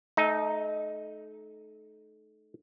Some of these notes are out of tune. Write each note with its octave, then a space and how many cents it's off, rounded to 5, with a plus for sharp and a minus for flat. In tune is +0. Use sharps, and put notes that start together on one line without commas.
A3 -30 D#4 +0